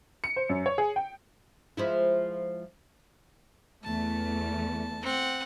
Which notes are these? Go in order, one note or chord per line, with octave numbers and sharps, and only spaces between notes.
C#7
C5
F#2
C#5
G#4
G5
F3 G#3 E4
E2 A3 A5
C4 F#5